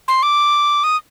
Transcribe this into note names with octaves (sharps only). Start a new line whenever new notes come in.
C6
D6
D#6